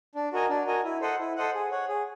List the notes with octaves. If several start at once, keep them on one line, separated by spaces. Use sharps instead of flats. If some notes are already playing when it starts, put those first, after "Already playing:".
D4
F#4 A#4 D#5 G#5
D4
F#4 A#4 D#5 G#5
E4
A4 C5 D#5 F#5
E4
A4 C5 D#5 F#5
G#4
C#5 F#5
G#4